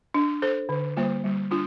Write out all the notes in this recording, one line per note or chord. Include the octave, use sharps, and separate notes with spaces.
D4
A4 C5
D3
G3 A#3 F4 C5
G3
D4 F4